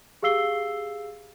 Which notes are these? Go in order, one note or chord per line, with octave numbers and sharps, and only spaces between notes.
G4 G#4 F5 E6 C7 G7